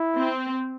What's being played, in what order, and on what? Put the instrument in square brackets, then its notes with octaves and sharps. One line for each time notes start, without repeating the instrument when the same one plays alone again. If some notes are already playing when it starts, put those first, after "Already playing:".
Already playing: [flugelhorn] E4
[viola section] C4